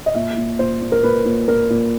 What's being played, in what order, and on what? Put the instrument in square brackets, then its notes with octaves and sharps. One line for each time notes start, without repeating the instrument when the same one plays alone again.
[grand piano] D#5
A#2 E5
A#2
A#2 C5
A#2
A#4
A#2 B4
A#2
A#2 A#4
A#2